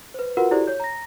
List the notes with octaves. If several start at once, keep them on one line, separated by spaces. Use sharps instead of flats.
B4 C5
F4 F#4 A#4 B4 F#5
E4 F#4 G4 A4 C5 D5
C#5 G6
A#5 A#6